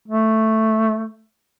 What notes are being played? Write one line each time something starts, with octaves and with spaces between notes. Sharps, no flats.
A3